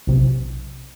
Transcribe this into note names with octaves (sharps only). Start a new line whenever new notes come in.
B1 C3